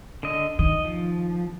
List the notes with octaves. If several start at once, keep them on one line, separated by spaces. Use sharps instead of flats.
D3 D#5
D#3 D#5
F3